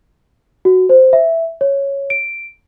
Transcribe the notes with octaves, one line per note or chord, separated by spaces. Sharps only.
F#4
C5
E5
C#5
D7